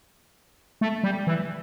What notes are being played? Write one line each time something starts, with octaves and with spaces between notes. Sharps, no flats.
A3
G3
E3